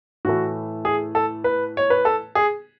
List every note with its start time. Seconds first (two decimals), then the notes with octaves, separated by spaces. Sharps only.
0.25 A2 E3 A3 F#4
0.85 G#4
1.15 A4
1.44 B4
1.77 C#5
1.90 B4
2.05 A4
2.35 G#4